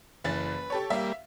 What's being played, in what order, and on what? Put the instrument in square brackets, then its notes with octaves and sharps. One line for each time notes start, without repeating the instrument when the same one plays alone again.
[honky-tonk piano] F#1 E3 A6 [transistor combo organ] B4
[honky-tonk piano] G4 A4 C#5
[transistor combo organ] G3 A#3 [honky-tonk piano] E5 F5